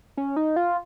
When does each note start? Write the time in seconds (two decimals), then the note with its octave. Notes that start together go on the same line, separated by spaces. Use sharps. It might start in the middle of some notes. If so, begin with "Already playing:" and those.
0.17 C#4
0.36 D#4
0.56 F4